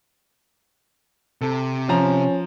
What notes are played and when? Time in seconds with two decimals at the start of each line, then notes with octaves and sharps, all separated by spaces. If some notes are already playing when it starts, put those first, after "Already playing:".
1.41 C3 A4
1.89 F3 C#4 A#5